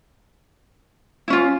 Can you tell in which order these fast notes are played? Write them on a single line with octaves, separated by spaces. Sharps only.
E4 C#4 F4